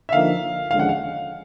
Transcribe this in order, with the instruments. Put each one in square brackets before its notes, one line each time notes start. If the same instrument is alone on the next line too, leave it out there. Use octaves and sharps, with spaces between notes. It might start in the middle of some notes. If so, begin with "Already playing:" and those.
[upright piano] E5
[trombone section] D3 F3 A#3 D#4 [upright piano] F5
[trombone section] D#2 D3 F3 G#3 C#4 [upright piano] F5
[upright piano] F#5
F5